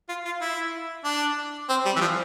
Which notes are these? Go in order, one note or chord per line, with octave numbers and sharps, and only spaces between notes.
F4
F4
E4
D4
C4
G3
E3
F3